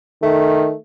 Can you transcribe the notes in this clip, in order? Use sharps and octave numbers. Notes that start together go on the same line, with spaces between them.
D#3 A3